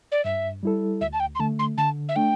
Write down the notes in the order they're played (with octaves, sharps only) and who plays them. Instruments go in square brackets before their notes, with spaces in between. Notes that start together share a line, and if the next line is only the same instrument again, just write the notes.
[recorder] D5
[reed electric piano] G2 [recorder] E5
[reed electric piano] G3 E4 A4
[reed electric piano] D2 [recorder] E5
[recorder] A5
G5
C6
[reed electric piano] D3 A3 [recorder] A5
[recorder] C6
[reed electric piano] D3 [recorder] A5
[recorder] E5
[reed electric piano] A3 D4 [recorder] G5